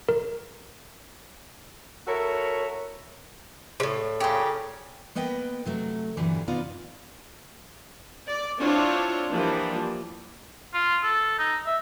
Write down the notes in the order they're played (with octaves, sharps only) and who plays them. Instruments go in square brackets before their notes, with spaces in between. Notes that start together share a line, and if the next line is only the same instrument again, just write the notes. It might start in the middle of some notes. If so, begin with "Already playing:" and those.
[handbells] A#4
[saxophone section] E4 F#4 A4 A#4 C#5
[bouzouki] A2 C3
[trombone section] A#2 C#3 [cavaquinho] G4 C5
[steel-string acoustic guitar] A#3 B3 B4 D#5 G5
C3 F#3 A3
G2 A#2 D3 E3 F#3 G3
C3 B3 D#4 F4 D5
[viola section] D5
C4 D4 E4 F4 C5 C#5
E3 F3 G3 A#3 D4
[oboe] F4
A4
D#4
E5